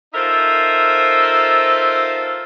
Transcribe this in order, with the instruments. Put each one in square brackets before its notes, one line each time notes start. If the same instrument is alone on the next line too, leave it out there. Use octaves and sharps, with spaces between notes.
[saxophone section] D#4 F4 A4 A#4 C5 E5